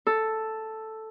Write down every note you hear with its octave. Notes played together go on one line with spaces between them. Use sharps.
A4